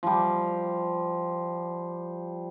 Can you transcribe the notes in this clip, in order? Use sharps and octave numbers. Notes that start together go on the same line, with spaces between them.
F3 G3